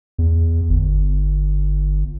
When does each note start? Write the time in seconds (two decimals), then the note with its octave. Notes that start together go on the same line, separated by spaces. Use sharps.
0.19 E2
0.69 G1